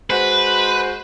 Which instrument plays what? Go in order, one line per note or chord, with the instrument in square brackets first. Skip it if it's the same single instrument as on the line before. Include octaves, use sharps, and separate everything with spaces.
[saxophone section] G#3 F#4 C5 [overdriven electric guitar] B4